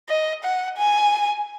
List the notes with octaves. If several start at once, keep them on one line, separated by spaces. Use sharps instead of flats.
D#5
F#5
G#5